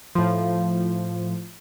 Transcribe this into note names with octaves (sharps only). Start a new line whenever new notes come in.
A2 F3